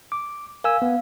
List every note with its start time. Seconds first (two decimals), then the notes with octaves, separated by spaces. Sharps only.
0.12 D6
0.64 A#4 F5 G#5 E6
0.82 B3